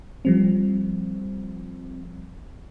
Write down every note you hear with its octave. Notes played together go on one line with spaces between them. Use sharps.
F3 G3 C4